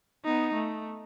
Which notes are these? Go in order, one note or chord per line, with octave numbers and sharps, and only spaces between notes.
B3 D#4
A3